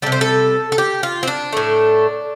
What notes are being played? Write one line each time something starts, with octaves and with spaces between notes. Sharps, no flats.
C3 G3 A4
C5
A4
A4
G4
F4
C4
D4
A2 A3